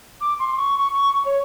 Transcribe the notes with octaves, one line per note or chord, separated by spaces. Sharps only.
D6
C6
C#6
C#6
C#6
C#6
C#5